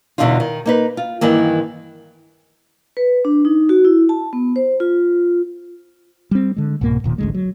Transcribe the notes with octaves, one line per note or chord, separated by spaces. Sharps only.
E2 B2 D3 G3 D#4 F4
D#3
A#3 D#4 B4
F4
G2 D#3 E3 A#3
B4
D4
D#4
F#4
E4
A5
B3
C5
F4
G3 C4
D3 G#3
C2 G#2 B2 A#3
E1 A#2 D#3
A1 D2 G#3
F#3